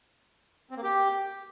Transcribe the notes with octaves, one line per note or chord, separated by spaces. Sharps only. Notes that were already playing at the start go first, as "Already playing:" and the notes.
C4
A#3
G4